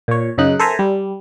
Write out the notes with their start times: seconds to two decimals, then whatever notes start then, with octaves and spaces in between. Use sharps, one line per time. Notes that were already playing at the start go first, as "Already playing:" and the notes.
0.08 A#2 C#5
0.38 F#2 C#3 D#4 F#6
0.59 A4 A#4 C5 E5 G#5 A#5
0.79 G3